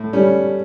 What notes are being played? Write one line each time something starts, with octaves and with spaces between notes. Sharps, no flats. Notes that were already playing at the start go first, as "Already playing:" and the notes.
Already playing: A2
G3 C#4